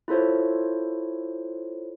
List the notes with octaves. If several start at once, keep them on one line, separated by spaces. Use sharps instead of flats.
E4 F4 A4 C5 C#5